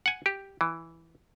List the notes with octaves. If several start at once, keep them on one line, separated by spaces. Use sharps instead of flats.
F#5 G#5
G4
E3